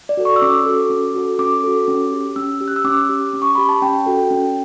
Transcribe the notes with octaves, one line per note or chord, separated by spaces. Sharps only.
D5
F#4 A4
C#6
E6
C#4 D6
F#4 A4
C#4
F#4 A4
C#4 D6
F#4 A4
C#4
G4
C#4 E6
G4
F#6
E6
C#4 D6
G4
C#4
C#6
G4 B5
A5
C#4 G5
F#4 A4
C#4